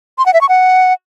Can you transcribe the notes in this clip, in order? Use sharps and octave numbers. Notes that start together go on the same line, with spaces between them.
C6
F#5
E5
C#6
F#5